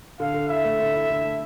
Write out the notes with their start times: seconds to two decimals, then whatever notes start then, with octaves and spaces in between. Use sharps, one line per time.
0.20 D3 F5
0.34 D3
0.49 E4 E5
0.64 A3
0.79 D3
0.94 E4
1.09 D3
1.24 A3